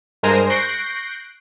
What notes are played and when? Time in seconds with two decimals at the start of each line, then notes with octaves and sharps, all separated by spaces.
0.23 G2 G#3 A#4 C5 G#5 A#5
0.50 C#6 F#6 G6 A#6 C7 D7